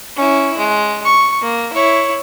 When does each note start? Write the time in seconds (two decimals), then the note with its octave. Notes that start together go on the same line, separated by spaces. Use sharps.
0.16 C#4 E4
0.58 G#3
1.05 C#6
1.42 A#3
1.73 E4 C#5